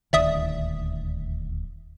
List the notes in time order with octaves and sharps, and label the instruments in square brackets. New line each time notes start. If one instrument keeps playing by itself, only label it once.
[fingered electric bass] D#1 D2 D#3 [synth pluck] D5 E5 D#6